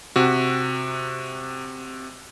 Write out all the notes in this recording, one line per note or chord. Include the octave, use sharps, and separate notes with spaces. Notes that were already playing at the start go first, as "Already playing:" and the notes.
C3 F#4